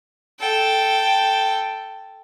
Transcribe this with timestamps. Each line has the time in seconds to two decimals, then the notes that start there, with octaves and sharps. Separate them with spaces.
0.40 A4 G5